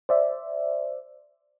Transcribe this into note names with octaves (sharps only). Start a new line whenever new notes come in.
C5 D5 E5